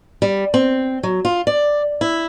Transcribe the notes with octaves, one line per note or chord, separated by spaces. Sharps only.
G3
C4
F#3
F4
D5
E4